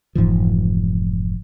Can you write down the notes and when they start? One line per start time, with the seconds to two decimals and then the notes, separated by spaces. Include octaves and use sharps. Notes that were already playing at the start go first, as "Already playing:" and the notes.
0.15 F1 G#2 E3 F3